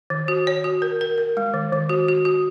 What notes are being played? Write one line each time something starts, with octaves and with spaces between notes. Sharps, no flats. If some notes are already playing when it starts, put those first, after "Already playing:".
D#3
F#4
C#5
F#4
A#4
A#4
A#4
G#3
D#3
D#3
F#4
F#4
F#4